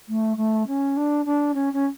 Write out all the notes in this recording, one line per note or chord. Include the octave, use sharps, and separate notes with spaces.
A3
A3
C#4
D4
D4
C#4
C#4